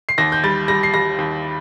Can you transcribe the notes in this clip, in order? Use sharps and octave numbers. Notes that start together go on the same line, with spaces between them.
C7
D#2 A#6
G6
G3 A6
G3 A#6
C7
G3 A#6
D#2